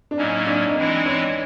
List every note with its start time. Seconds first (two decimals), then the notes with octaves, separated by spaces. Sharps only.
0.11 D4
0.18 A2 F#3 A#3 C#4 D#4
0.47 D4
0.67 D#4
0.76 E3 G#3 C4 D4 E4
1.06 C#4